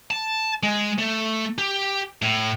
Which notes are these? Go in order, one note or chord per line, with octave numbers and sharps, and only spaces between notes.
A5
G#3
A3
G4
A2